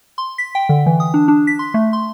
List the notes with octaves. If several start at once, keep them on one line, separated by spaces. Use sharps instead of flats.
C6
B6
G5
D3
E3
D#6
D4
D4
B6
C6
A3
C6